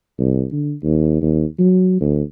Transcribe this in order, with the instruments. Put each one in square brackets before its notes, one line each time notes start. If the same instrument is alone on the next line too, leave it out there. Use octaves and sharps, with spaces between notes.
[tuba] C2
D3
D#2
D#2
F#3
D2